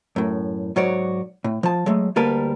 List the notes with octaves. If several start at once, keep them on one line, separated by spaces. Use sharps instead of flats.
F#2 A2
G#2 F#3 F#4 C#5 D5
A2
F3 A5
F#3 G#3 A3
D2 G3 A#3 A#4 B4 A5